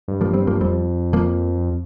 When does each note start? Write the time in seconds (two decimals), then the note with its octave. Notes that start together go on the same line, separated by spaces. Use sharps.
0.08 G2
0.21 F3 A#3
0.34 G3 C4
0.47 F3 A#3
0.61 F2 G3 C4
1.13 F3 A#3